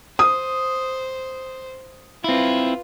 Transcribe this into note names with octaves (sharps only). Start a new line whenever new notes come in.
C5 D#6
C4 E4 F4 B4